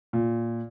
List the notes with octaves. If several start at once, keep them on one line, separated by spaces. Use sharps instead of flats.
A#2